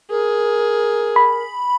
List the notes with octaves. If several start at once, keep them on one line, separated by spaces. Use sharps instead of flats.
G#4 A#4
B5